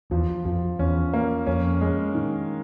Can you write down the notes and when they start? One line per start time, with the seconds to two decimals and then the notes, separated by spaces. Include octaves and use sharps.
0.11 E2 F3
0.45 F2 F3
0.79 E2 C#4
1.13 A#3
1.47 F2 C#4
1.81 G#3
2.15 D#3